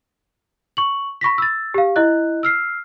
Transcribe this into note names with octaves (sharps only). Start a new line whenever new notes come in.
C#6 F#7
B5 C#6 A#6 B6
E6 A6
G4 F5
E4 D#5 F#6
E6 F6 C7